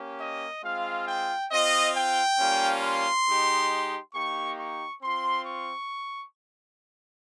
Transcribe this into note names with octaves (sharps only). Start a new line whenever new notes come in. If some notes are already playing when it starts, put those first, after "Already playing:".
Already playing: A#3 C#4 G4
D#5
G#3 C4 F4 F5
G5
C4 F4 D#5
G5
G3 A#3 C#4 F4
C6
G#3 D#4 G4
A#3 D#4 G4 C#6
C#6
C4 F4 C6
C#6